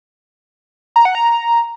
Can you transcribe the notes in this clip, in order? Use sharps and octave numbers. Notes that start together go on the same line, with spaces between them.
A#5
F#5
A#5